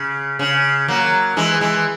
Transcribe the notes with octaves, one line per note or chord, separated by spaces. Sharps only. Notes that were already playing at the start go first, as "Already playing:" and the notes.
Already playing: C#3
C#3
F#3 A#3
E3 G#3
E3 G#3